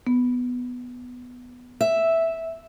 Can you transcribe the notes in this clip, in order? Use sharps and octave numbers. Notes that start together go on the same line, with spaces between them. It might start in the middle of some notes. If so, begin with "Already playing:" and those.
B3
E5